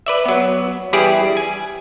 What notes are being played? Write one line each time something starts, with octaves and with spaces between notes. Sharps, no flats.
B4 D5 E5
F#3 B3
E3 G3 E4 G4 G#4 D5
G#5